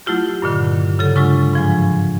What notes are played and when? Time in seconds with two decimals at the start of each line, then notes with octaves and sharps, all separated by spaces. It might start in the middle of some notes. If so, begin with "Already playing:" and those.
0.06 F#3 A3 E4 F4 G4
0.42 G2 A#2 D3 D#3
0.99 C#3 F#3 A4
1.15 F#3 G#3 D4 F4 C#6 E6
1.53 G#2 F3 G#5